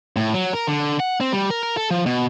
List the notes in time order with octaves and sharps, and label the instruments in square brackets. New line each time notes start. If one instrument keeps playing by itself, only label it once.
[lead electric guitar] A2
F#3
A#4
D3
F#5
C4
G3
A#4
A#4
A4
F3
B2